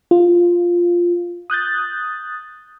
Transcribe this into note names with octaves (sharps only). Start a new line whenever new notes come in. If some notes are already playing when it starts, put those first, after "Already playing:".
F4
D#6 F#6 G6 A6